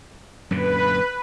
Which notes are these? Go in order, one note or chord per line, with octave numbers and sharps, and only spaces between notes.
F#2 A#2 D3 B4